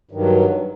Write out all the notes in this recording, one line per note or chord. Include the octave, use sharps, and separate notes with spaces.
G2 D#3 F#3